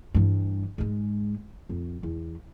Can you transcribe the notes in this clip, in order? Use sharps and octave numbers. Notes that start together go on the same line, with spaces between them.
G2 E3
G#2 G#3
F2
E2